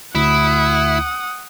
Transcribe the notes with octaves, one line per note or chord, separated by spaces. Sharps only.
D2 E4 F#5 D#6